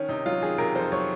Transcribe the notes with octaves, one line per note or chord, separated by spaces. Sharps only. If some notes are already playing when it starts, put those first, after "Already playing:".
Already playing: D#3 C#4
C3 D#4
F#3 F4
D#3 G#4
C3 A#4
F2 C5
F#3 C#5